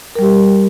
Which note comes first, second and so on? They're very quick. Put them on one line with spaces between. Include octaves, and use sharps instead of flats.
A#4 G3 G4